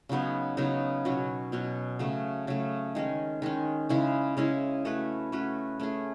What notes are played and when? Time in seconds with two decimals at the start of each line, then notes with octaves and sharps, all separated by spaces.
0.09 C#3 F#3 B3 D#4
0.57 C#3 F#3 B3 D#4
1.05 B2 F#3 C#4 F#4
1.52 B2 F#3 C#4 F#4
1.99 C#3 F#3 A3
2.47 C#3 F#3 A3
2.95 D#3 G#3 C#4
3.42 D#3 G#3 C#4
3.89 C#3 G#3 C#4 E4
4.37 C#3 G#3 C#4 E4
4.85 A3 C#4 F#4 B4
5.32 A3 C#4 F#4 B4
5.80 A3 C#4 G#4